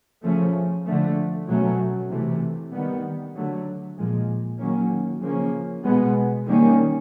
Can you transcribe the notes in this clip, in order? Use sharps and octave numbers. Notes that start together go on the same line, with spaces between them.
C#3 F3 A3 C#4
D3 F3 A3
B2 F#3 A3 C#4
C3 E3 A3
D#3 G3 B3
D3 F#3 A3
A#2 F3 G#3
D#3 F#3 A#3 C#4
C#3 F3 A#3 C#4
B2 G#3 B3
D#3 G3 A#3 C#4